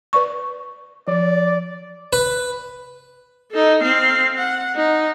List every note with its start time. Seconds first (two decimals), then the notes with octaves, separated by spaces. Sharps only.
0.13 B4 D5 C#6
1.08 F3 D5
2.13 B4
3.51 D#4 A4
3.83 C4 F5
4.36 F#5
4.76 D#4